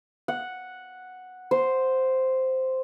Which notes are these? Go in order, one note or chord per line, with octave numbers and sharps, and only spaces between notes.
F#5
C5